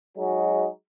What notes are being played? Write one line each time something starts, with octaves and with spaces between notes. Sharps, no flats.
F#3 G#3 D#4 F#4 G#4